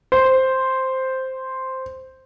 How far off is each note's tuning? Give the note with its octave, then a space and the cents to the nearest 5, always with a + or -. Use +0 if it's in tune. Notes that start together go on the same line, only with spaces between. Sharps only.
C5 +0